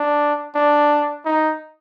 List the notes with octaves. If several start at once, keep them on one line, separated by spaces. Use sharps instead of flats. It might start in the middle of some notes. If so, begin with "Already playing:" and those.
Already playing: D4
D4
D#4